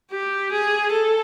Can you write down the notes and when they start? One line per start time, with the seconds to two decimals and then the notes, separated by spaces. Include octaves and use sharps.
0.12 G4
0.52 G#4
0.92 A4